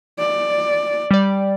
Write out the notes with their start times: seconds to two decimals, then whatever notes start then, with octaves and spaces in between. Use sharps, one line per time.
0.19 D5
1.11 G3 D5